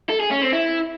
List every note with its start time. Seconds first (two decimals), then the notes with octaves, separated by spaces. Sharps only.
0.10 A4
0.20 G#4
0.31 C#4
0.42 C4
0.53 E4